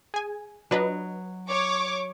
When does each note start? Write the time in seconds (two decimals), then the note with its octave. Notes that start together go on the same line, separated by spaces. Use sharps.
0.14 G#4 G#5
0.71 F#3 D4 B4 D#5
1.48 C#5 C#6 D6